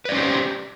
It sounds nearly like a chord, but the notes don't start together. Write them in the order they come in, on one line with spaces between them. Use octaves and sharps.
B4 D5 C#4 C5 G4